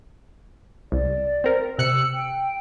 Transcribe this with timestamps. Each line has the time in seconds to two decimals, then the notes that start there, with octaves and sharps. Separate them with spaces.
0.92 C2 D5
1.44 C4 A#4
1.79 C3 E6 F#6 C#7
2.14 G5